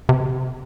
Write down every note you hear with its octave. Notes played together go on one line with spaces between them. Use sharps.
C3